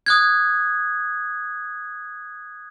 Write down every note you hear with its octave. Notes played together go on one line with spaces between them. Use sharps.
D#6 F#6 G#6